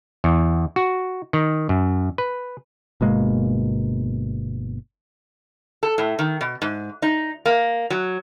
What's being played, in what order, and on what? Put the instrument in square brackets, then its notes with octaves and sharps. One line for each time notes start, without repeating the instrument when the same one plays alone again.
[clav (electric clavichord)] E2
F#4
D#3
F#2
B4
[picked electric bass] G1 B2 G#3 A#3
[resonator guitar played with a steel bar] A4
A2
D#3
B2
G#2
D#4
A#3
F#3